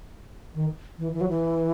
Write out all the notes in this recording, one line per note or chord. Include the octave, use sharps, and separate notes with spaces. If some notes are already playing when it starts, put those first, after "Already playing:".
D#3
E3
E3
F#3
E3